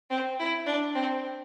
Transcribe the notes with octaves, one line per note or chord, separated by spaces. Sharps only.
C4
E4
D4
C4